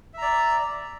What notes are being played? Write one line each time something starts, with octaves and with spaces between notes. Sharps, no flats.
D5 E5 A#5